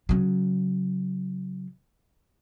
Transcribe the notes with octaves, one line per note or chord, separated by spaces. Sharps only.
C#3 F#3